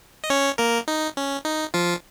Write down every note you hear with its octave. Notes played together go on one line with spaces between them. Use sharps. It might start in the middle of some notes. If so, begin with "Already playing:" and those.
D#5
C#4 C#5
A#3 A#4
D#4
C#4
D#4
F3 F4